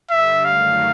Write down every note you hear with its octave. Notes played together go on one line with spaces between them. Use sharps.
G2 D3 G3 E5
F#2 D#3 F#3 A3 F5